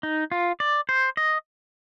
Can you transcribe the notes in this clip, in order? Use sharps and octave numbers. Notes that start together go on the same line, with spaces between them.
D#4
F4
D5
C5
D#5